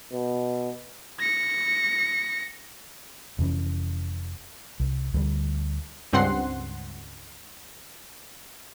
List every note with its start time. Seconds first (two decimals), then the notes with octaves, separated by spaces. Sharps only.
0.13 B2
1.20 A#6 C#7
3.39 F1 F2 E3 C#4
4.80 C2
5.14 D2 D3 E3 G3
6.13 C#2 G2 C4 F#5 C6 C7